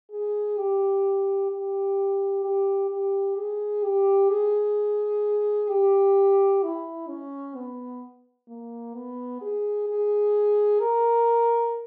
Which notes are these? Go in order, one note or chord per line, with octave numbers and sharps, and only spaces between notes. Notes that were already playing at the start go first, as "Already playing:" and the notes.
G#4
G4
G4
G4
G4
G#4
G4
G#4
G4
E4
C#4
B3
A#3
B3
G#4
G#4
A#4